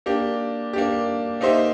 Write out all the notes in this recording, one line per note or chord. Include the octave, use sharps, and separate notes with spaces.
A#3 D4 G4
A#3 D4 G4
A#3 D#4 G4 C5 E5